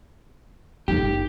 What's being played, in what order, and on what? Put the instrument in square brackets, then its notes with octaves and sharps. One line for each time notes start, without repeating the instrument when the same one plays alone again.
[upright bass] F#1 D#4 [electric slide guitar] G4